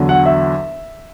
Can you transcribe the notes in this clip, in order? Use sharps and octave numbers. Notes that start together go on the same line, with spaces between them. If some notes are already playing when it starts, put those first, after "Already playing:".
Already playing: E2 D3 F#3
F#5
E5